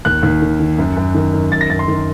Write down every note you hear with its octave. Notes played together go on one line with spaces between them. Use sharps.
D#2 F#6
D#2
D#3
D#3
F#2
F#2
D#3
D#3
F#2 A6
A#6
F#2 A6
C6
D#3